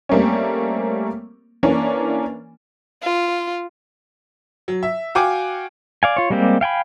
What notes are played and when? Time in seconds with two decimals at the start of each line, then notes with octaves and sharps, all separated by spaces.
0.09 G3 A3 A#3 C4 C#4
1.63 E3 A#3 C#4 D4
3.03 F4
4.68 F#3
4.83 E5
5.15 F#4 F5 G5 G#5 D6
6.03 D5 F5 G#5
6.17 F4 C#5
6.30 G3 G#3 A#3 C4 G4
6.61 F5 G5 G#5 B5